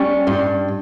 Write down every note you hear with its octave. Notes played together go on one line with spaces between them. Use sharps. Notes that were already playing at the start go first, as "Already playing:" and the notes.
Already playing: G3 C#4
G2